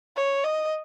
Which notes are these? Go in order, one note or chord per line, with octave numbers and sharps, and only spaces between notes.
C#5
D#5